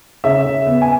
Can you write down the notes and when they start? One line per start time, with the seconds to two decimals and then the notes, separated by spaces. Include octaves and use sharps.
0.24 C#3 E5
0.46 C#3
0.67 B3
0.82 G#5